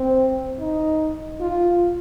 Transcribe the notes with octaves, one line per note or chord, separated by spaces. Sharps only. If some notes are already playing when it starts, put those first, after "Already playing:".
Already playing: C4
D#4
F4